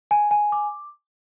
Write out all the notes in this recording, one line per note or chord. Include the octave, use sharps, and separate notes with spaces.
G#5
G#5
D6